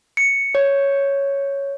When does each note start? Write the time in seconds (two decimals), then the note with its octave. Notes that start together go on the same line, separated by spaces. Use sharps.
0.17 C#7
0.55 C#5